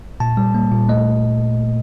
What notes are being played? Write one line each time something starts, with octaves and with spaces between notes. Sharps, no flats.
A#2 A5
G3
A#3
A#2
A3 D#5